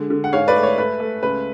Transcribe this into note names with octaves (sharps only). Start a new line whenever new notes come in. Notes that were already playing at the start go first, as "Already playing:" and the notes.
Already playing: D3 G#3
D3
F#5
G#2 C#5 F5
B4 D5
A3
C#5
A3 B4
A3
C#2 B4